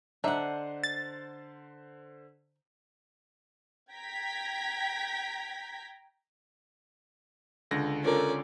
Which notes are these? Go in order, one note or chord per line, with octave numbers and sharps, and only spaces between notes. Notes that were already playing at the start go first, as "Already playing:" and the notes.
D3 D4 D#4 C5 E5 F#5
A6
G5 A#5 G#6 B6
C#2 D3 A#6
C#4 F4 A4 A#4 D5